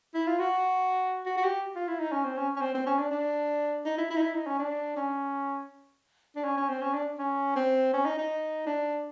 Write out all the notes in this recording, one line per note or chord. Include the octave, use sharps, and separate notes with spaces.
E4
F4
F#4
F#4
F#4
G4
F4
E4
D#4
C#4
C4
C#4
C#4
C4
C4
C#4
D4
D4
D#4
E4
E4
D#4
E4
D#4
C#4
D4
C#4
D4
C#4
C#4
C4
C#4
D4
C#4
C4
C#4
D#4
D#4
D4